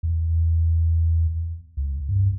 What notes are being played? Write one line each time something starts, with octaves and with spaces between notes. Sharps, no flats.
E2
C#2
G2